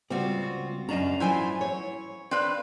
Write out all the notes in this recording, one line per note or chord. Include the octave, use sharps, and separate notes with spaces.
C#2 G3 C4 F4 F#4
F#2 C#4 D4 D#5 F5 A#5
F3 F#3 E4 C5 G#5
C#5
C4 B4 D5 F5